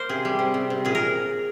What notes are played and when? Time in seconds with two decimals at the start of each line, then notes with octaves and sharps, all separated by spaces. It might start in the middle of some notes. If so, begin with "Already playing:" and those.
Already playing: A#3 A#4 C5
0.09 C3 G#4
0.25 G3
0.39 C3
0.54 C3
0.70 C3
0.85 A#2 G#4
0.95 A#4